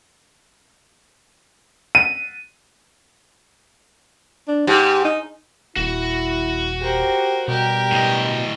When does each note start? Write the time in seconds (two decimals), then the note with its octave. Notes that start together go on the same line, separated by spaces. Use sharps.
1.95 D#7
4.47 D4
4.67 G#2 G4
5.04 D#4
5.76 D#1 E4 F#4
6.82 G4 A#4 C5
7.48 B2 G3 G4 A#4
7.92 A2 D#5